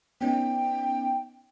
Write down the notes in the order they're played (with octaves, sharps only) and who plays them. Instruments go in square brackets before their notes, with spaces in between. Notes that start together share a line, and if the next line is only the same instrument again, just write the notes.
[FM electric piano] B3 C#4 D#4 [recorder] G5